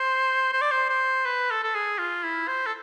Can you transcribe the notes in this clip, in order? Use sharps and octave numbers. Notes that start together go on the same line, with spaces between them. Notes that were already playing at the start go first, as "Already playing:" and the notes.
Already playing: C5
C5
D5
C5
C5
B4
A4
A4
G#4
F4
E4
C5
A4